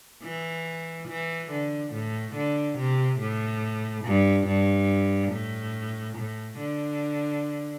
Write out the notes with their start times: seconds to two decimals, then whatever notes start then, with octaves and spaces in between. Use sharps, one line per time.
0.23 E3
1.08 E3
1.51 D3
1.94 A2
2.36 D3
2.79 C3
3.20 A2
4.05 G2
4.47 G2
5.33 A2
6.17 A2
6.59 D3